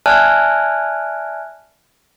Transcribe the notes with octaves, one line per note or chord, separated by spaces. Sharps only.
D5 E5 G#5 A5 F6 F#6